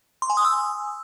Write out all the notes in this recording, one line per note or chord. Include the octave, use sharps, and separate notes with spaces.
C6
G#5
D#6
E6